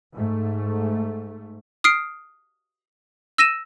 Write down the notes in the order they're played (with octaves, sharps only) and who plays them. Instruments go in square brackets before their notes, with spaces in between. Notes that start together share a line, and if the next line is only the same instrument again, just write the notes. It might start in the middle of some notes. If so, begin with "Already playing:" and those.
[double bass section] G#2 A3
[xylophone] D#6 F6 C7 D7
E6 A#6 D#7 E7